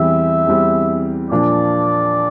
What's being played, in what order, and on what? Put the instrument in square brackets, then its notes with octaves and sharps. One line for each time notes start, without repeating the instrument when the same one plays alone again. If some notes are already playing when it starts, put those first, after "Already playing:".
Already playing: [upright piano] E2 E3 G3 C4 [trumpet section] E5
[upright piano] E2 E3 G3 C4
[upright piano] A#2 F3 A#3 D4 [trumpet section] D5